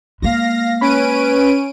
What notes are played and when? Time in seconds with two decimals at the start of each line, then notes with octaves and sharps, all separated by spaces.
0.22 G#3 A#3 F5 A#6
0.81 C#4 B4 D7 D#7